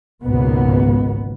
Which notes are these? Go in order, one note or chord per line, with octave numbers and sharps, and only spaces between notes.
G#1 C#2 G#2 B2 A#3 B3